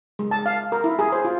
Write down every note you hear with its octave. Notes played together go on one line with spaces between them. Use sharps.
G#3
A5
F5
A#4
E4
G#4
C5
F4